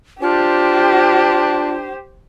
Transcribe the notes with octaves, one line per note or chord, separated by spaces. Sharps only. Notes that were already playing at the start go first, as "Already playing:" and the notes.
D4 F4 G4 C5